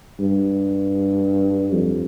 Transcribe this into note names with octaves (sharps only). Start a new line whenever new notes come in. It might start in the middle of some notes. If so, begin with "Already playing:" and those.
G2
F2